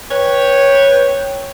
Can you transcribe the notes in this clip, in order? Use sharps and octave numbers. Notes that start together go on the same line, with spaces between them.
B4 C#5 G5